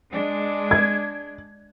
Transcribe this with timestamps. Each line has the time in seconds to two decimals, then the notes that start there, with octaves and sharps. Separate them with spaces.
0.12 G#3 D4
0.71 G#6